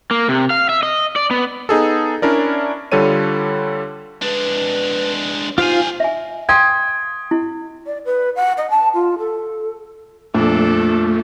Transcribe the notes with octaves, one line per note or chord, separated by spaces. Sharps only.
A#3
C3
F5
E5
D#5
D5
B3
B3 D#4 G#4 A4
C#4 D4 E4 A#4 D5
D3 G3 F4 A4 C#5 D#7
G#3 D4 B4
D#4 F4 G4 C5 F5 G#5
E5 G#5
F5 G5 C6 D#6 G#6
E4
D5
B4
F#5
D#5
A5
F4
A4
F2 A#2 A3 D4 A4